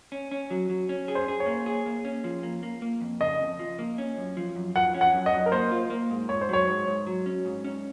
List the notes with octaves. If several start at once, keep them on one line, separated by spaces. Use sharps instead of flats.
C#4
C#4
F#3
F#3
C#4
G#4
C5
G#4
C#5
A#3
G#4
A#3
C#4
F3
A#3
A#3
A#3
F2
C#3 D#5
F2
F3
A#3
C#4
F#2
F3
F#2
F3 F#5
C#4
F#5
F#2
D#5
F#2
A#4
A#3 C5
F4
A#3
G#2
G#2 C#5
C5
F#3 C#5
G#2
G#2
F#3
C#4
G#2
C#4